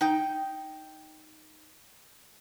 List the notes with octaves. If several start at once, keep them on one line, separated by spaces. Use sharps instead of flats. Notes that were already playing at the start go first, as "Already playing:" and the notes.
D#4 G5